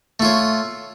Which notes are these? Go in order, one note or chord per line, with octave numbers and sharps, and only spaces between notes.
A3 F4 C#5